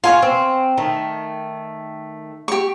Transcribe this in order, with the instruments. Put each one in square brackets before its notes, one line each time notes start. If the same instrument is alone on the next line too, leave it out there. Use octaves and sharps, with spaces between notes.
[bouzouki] F4 [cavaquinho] F5 G#5 C#6
[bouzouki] C4
D#3 A3
[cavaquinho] G4 C#6